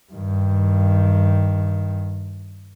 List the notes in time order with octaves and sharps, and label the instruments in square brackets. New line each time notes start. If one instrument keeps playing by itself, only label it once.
[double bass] G2 D#3